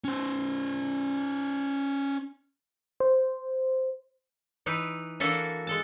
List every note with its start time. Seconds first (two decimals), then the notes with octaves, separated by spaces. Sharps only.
0.04 C#4 C5
3.00 C5
4.66 E3 D#4 E4 B4
5.20 E3 A#3 D4 F#4 A4 E5
5.67 G#3 A4 A5